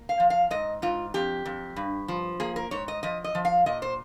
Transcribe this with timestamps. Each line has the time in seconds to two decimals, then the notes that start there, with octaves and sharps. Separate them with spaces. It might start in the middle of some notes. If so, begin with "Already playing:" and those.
Already playing: A#3
0.09 F5
0.20 F3
0.30 F5
0.51 G#2 D#5
0.82 G#2 F4
1.14 F2 G4
1.46 F2
1.76 G2
2.08 F3
2.40 A#3 G#4
2.56 A#4
2.71 G#2 C#5
2.88 D#5
3.03 F3 D#5
3.24 D#5
3.35 F3
3.45 F5
3.66 A#2 D#5
3.82 C5